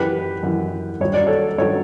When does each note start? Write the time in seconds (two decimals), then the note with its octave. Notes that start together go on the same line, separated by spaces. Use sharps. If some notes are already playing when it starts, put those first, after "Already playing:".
Already playing: F#2 E3 G4 B4
0.43 F#2 E3
1.00 G2 F#3 C#5
1.14 D5
1.27 A4 C#5
1.58 G2 F#3 A4 C#5